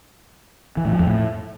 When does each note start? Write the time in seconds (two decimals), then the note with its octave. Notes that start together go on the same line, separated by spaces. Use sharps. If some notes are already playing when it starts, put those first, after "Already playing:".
0.77 E3
0.85 A2
0.92 F3
1.00 F2
1.07 A2